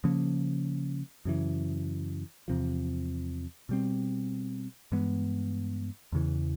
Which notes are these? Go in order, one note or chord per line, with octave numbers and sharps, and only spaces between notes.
C#3 F3 A#3 C#4
F#2 C#3 E3
E2 C3 F3
B2 G3 C4
G2 E3 G#3 B3
E2 C#3 E3